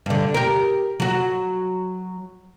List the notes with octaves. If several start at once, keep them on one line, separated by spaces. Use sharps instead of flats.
G2 D3
G4 A#4
F#3 F#4